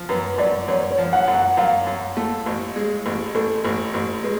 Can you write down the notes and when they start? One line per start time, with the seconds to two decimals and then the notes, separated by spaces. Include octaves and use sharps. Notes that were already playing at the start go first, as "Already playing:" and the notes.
Already playing: F3
0.09 F#2 B4
0.38 F#2 D5
0.68 F#2 C#5
0.91 C#5
0.98 F3
1.13 F#5
1.28 F#2
1.35 F#5
1.57 F#2 F5
1.87 F#2
2.17 A3
2.46 A1
2.76 G#3
3.06 A1
3.35 A1 A4
3.65 A1
3.94 A1
4.23 G#3 B4